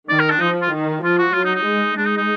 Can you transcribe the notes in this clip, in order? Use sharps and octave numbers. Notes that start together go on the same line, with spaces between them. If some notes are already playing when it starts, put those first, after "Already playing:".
D#3 D5
A#4
D4
F3 D#4
F4
D#3
F3 F4
F#4
F#3 F4
D#4
D#4
G#3
G#3 D4
D#4
D#4